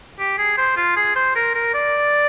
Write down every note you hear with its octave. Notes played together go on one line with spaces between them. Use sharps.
G4
G#4
C5
F4
G#4
C5
A#4
A#4
D5